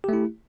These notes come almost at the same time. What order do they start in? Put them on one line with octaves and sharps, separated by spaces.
G4 A3 E4